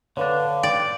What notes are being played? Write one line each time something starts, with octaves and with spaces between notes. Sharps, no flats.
D3 D4 B4 C#5 F5
D5 G5